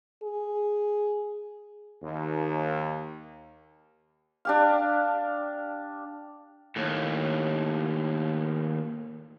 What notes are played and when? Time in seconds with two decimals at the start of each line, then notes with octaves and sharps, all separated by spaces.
0.23 G#4
2.03 D#2
4.45 D4 G4 F5
6.76 D#2 A2